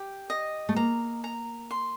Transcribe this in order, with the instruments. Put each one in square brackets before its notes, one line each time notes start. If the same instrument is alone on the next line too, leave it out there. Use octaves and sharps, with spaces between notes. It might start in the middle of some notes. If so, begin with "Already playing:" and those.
Already playing: [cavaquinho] G4
D#5
[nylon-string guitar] A3
[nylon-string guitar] A#3 [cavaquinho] A#5
[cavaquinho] A#5
C6